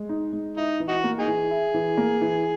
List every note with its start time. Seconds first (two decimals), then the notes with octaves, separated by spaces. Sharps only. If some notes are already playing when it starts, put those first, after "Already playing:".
Already playing: G#3
0.09 D#4
0.33 G#3
0.57 D#4 E4
0.80 E3
0.88 D#4 F#4
1.04 A#3
1.19 D#4 G#4
1.27 E3
1.51 E4
1.74 E3
1.97 A#3
2.22 E3